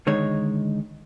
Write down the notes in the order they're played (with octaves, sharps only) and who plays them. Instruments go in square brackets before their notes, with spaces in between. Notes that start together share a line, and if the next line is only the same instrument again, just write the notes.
[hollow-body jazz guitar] D3 D#3 G#3 D#4 C#5